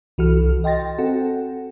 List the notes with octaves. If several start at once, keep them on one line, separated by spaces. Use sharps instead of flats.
C2 E3 F#4 A4 F6
D#5 G5 C6 A6 A#6
C4 F#4 A4 F#5